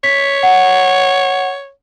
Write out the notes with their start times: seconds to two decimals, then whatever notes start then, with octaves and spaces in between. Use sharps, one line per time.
0.04 C#5 B6
0.43 F#5